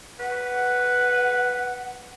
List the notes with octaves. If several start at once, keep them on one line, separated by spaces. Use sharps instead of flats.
B4 F#5